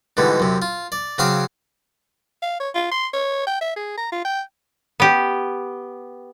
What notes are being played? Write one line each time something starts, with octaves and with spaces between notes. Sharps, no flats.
G#2 B2 D3 E3 G3
F#2 C3
F4
D5
C#3 F#3 C4 F5 D6
F5
C#5
F4
C6
C#5
G5
E5
G#4
A#5
F4
G5
B3 G4